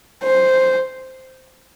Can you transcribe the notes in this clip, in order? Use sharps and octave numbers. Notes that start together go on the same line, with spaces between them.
C5